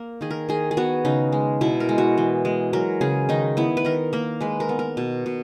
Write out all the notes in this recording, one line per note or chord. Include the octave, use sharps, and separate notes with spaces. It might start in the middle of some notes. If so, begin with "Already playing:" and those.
Already playing: A#3 A#4
D#3 G#4
A#4
D#3 G#4
G#4
B3 F#4
C#3 D#4
G#3
B2 E4
A#4
G#3
F#4
E3
G#3
F#3 A#4
C#3 G#4
D#3 D#4
B3 E4
B4
D#3 A#4
A#3 A#4
G#3 B4
A#4
B3
A#4
B2
B2